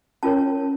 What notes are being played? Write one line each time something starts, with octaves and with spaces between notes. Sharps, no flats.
C#4 F4 A#4 C#5 A5